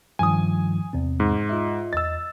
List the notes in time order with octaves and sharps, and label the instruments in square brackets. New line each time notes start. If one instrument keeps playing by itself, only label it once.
[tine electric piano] G2 D#3 F3 [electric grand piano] G#5 D#6
[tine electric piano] E2 C3 C4
[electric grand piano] G#2
[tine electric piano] F4 D#5 E5
[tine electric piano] E2 D#5 [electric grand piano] E6 A6